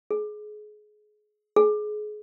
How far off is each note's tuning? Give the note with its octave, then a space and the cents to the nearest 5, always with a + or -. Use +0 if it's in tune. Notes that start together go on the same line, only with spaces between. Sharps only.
G#4 +25
G#4 +25